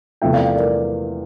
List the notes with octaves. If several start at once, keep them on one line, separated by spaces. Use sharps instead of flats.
E2 C3 F3 A3 E5 G5
D5 F5
A#4 D5